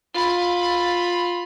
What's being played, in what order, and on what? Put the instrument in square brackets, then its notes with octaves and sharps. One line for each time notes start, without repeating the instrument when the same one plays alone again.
[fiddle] F4 B5